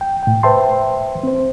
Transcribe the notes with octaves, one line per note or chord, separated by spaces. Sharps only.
G5
A2 G5
B4 C5 E5 G5 A5 C6
C4 C5